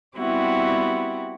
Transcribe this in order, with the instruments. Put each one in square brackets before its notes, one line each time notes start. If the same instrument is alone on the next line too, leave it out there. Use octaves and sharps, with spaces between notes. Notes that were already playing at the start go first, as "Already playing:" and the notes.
[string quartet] G3 B3 C4 E4 F#4 G4